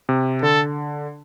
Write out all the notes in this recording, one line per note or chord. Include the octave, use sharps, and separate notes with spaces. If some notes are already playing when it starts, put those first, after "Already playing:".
C3
D3 A4